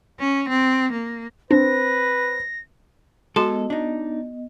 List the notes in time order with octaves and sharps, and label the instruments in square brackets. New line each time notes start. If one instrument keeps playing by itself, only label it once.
[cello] C#4
C4
A#3
[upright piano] C4 [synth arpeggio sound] D4 [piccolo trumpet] B4 [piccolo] A#6
[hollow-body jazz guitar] G#3 A4 [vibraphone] B3 D#5 [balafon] F#4 C6
[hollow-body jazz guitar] D4 D#4